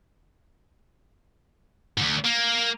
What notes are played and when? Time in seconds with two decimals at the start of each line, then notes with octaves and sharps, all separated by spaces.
1.97 D2 G#2
2.25 A#3